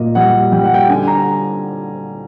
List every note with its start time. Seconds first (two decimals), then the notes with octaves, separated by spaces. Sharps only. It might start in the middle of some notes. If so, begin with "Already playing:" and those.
Already playing: A#2 A#3 D#5
0.15 G3 F#5
0.52 G3 G5
0.64 F#5
0.74 G5
0.89 D3 G#5
1.07 A#5